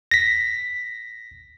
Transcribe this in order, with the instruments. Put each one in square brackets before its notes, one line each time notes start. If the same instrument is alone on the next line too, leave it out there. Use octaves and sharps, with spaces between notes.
[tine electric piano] A#6 B6